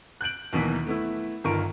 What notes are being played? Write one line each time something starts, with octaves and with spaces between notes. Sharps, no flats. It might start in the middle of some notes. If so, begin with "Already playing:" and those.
F#6 G6 D7 F#7
D#2 B2 E3 F#3 A#3 B6
A3 B3 E4
G1 D#3 F4 A#4 C#6 D7